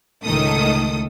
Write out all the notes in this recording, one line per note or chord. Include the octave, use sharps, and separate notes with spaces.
C#2 A2 D#3 A4 D#6